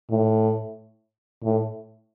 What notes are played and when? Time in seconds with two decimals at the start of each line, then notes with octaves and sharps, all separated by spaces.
0.10 A2
1.44 A2